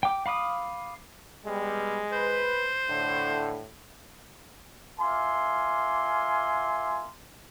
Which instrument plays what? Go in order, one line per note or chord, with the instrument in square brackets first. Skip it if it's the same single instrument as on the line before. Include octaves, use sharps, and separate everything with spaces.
[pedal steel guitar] G5 D6
F5 B5 D6 D#6
[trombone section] G3 B3 [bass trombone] G#3
[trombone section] B4 [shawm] C5
[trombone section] A2 [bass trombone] D3
[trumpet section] F4 A#4 E5 G#5 C6 D6